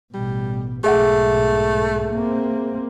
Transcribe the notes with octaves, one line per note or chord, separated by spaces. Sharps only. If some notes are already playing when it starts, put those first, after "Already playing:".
A1 B2 G3
B1 G#2 A3 G#4 E5 F#5
A#3 C4